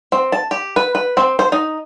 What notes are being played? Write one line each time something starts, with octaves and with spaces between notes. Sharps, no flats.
C4
A5
G4
B4
B4
C4
C5
D#4